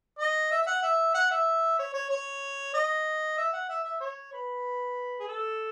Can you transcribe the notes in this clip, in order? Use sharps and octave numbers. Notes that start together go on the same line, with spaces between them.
D#5
E5
E5
F#5
E5
F#5
E5
C#5
C#5
C#5
D#5
E5
F#5
E5
E5
C#5
B4
G#4
A4